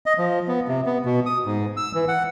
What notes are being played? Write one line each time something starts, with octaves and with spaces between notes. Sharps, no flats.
D#5
F3
B3
C3
B3
B2
D#6
G#2
E6
E3
F#5